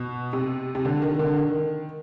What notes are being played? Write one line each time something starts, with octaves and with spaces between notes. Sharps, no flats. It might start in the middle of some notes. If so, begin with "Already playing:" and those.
Already playing: B2
C3
C3
D3
D#3
D3
D#3